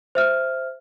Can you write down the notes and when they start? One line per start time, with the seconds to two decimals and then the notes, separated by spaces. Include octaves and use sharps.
0.15 C5 E5 F6